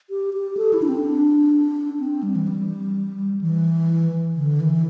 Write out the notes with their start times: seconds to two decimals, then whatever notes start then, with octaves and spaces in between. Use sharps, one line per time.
0.10 G4
0.34 G4
0.57 A4
0.73 E4
0.82 D4
0.89 C4
1.05 D4
1.99 C4
2.23 G3
2.35 E3
2.47 G3
3.41 E3
4.36 D3
4.60 E3